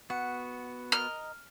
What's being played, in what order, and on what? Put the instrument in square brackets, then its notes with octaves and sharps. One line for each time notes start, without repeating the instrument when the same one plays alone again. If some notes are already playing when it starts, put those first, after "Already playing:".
[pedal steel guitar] B3 F#4 [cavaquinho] F#5
[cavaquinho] A#4 D#5 [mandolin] F6